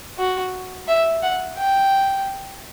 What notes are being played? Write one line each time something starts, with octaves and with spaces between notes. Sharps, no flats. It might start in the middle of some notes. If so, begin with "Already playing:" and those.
F#4
E5
F#5
G5